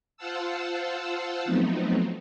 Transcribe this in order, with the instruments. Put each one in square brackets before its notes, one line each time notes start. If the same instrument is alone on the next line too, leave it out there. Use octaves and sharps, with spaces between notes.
[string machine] F4 C5 F5 F#5 A5 E6
F3 F#3 A3 B3 C4 D#4